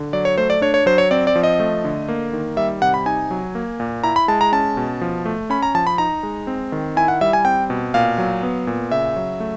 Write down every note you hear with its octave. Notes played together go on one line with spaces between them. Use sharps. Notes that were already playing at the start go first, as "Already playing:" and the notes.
Already playing: D3
F#3 D5
C#5
A3 C5
D5
D4 C#5
C#5
F#3 C5
C#5
C4 D5
D5
F3
D#5
A3
D3
A#3
D#3
G3 E5
C3 F#5
B5
D#4 G#5
F#3
A#3
A#2
E4 A#5
B5
G#3 A5
A#5
C#4 A5
B2
F3
A3
C#4 B5
A#5
F3 A5
B5
D#4 A#5
G#3
C4
D#3
E4 G#5
F#5
G3 E5
G#5
C4 G5
B2
A#2 F5
F#3
B3
A#2
C#3 E5
F#3
A3